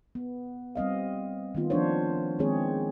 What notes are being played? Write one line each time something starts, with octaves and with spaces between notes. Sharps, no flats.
B3
G3 C4 D#5 F5
D#3 A3 B3 F4
F3 A#3 C4 D4 C5 C#5
D#3 G#3 B3 C4 G#4 C#5